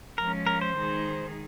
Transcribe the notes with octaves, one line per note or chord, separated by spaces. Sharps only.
F3 G#3 C#4 A#4
A#4
C5
D#3 G#3 D#4 G#4